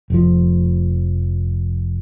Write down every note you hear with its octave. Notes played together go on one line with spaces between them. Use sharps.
F1 F3